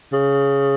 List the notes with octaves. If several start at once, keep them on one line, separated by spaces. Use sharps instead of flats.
C#3